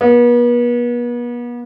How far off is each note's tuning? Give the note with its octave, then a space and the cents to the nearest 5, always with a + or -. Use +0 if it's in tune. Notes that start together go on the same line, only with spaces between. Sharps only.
B3 -40